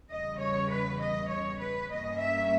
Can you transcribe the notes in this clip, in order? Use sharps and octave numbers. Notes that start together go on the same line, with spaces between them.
E2 C#3 G3 D#5
C#5
B4
D#5
C#5
B4
G2 G3 A#3 C#4 D#5
E5